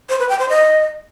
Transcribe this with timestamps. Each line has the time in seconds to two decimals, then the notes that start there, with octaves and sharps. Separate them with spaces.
0.09 C5
0.19 B4
0.29 G5
0.39 C5
0.49 D#5